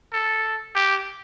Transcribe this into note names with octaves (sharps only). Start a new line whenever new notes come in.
A4
G4